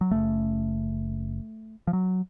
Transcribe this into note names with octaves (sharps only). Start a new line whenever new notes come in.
F#3
F#1 F#2 C#3 A3
F3
F#3